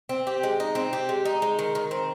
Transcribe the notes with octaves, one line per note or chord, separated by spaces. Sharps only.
C4
G4
G#3
D#4
C4
G4
G#3
D#4
G#3
D#3
D#3
C4